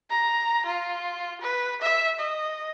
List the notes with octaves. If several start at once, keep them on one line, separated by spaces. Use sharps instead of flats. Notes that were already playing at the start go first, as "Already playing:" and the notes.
A#5
F4
B4
E5
D#5